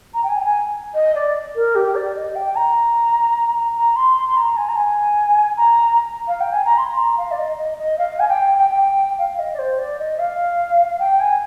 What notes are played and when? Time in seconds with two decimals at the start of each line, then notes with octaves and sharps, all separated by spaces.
0.14 A#5
0.23 G5
0.29 G#5
0.40 G5
0.45 G#5
0.94 D#5
1.15 D5
1.55 A#4
1.75 G4
1.95 D5
2.16 D#5
2.35 G5
2.56 A#5
3.76 A#5
3.96 C6
4.16 C6
4.28 C6
4.36 A#5
4.57 G#5
4.69 A#5
4.76 G#5
5.57 A#5
6.28 F5
6.40 G5
6.52 G#5
6.65 A#5
6.78 C6
6.97 A#5
7.18 F5
7.31 D5
7.38 D#5
7.58 D#5
7.78 D#5
7.98 F5
8.20 G#5
8.28 G5
8.58 G5
9.19 F5
9.39 D#5
9.54 D5
9.59 C5
9.79 D5
9.99 D#5
10.19 F5
10.99 G5
11.20 G#5